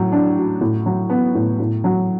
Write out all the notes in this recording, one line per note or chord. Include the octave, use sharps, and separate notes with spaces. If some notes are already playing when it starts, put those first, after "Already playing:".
Already playing: A2 F#3
D4
F#4
A2
F#3
B3
A2
A2
F#3